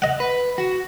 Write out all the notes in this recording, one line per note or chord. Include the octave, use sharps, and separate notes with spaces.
D#5 F#5
B4
F#4